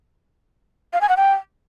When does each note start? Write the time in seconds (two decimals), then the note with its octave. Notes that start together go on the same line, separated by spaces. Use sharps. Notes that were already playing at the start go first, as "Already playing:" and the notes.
0.93 F5
1.01 G#5
1.09 F#5
1.17 G5